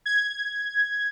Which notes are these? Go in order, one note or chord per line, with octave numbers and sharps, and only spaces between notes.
G#6